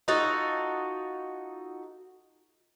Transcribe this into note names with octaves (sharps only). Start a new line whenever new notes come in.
D#4 F4 F#4 A4